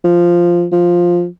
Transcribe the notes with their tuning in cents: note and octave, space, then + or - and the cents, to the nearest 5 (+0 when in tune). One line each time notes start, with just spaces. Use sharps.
F3 -5
F3 +5